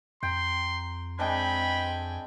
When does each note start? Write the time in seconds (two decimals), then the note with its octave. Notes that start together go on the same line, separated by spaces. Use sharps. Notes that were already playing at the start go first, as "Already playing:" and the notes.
0.23 F2 G5 A#5 C6
1.19 G#3 C4 D4 G5 G#5 B5